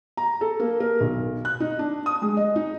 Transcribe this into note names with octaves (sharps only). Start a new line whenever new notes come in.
A#5
A4
A#3
A#4
B1
F#6
D#4
D4
D#6
G#3
D#5
D#4